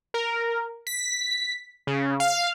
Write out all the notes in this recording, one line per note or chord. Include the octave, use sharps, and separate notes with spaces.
A#4
B6
C#3
F5